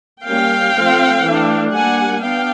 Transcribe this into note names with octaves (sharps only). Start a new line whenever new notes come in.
G3 A#3 C#4 F5 G5
F3 A3 C4
E3 A3 D4
G3 A#3 D4 F#5 G#5
B3 D4 F5 G5